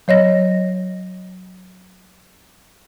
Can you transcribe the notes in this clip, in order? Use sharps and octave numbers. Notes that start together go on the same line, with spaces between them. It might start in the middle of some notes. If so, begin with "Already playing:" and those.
F#3 C#5 D#5 A#6